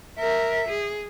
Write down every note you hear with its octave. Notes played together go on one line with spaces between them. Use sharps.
A#4 E5
G#4